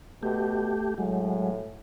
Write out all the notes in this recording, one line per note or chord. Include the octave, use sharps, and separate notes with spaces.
B2 A3 G4
A2 F#3 G#3